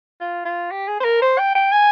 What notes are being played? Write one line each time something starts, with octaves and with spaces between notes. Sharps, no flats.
F4
F4
G4
G#4
C5
A#4
C5
G5
G5
G#5